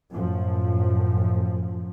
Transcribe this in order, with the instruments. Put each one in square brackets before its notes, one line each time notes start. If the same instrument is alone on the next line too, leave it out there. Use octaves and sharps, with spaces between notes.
[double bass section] F#2 A2 F3